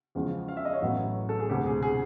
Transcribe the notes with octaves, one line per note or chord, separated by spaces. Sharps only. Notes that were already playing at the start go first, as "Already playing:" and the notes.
E2 C#3 F3 G#3
F5
E5
D#5
C#5
A1 A2 F#3 B3
A4
G#4
E1 D2 C3 G4
G#4
G#4